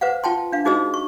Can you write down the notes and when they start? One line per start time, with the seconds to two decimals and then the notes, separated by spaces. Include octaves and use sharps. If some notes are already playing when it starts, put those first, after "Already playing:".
0.01 B4 C5 F5 F#5
0.24 F4 G5 A5 C6
0.52 D4 F5
0.65 D#4 F#4 G#4 C5 D#5 E6
0.94 C#6